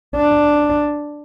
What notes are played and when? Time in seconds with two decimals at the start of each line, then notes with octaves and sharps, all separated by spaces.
0.16 D4